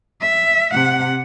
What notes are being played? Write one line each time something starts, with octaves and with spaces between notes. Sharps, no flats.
E5
C3 F#5